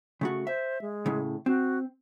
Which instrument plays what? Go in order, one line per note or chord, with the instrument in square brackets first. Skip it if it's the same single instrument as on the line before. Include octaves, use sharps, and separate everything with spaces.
[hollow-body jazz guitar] C#3 A3 F#4
[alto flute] C5 [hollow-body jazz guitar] E5
[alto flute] G#3
[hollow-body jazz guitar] A2 C#3
[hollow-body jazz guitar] C4 [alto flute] F#4